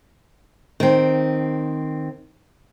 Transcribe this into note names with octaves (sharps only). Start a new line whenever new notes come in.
D#3 C4